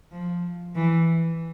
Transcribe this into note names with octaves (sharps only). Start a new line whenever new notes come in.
F3
E3